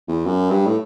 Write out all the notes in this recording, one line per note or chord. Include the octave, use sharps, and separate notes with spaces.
E2
F#2
G2
A2